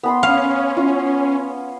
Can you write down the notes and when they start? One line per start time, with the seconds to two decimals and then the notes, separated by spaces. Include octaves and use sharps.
0.03 B3 B5 C6
0.23 C#4 F5
0.77 F4